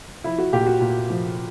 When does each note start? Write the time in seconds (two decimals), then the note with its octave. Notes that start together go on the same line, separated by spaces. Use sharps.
0.24 F3 E4
0.38 F#4
0.52 A#2 G4
0.67 F#4
0.81 A#2
1.10 F3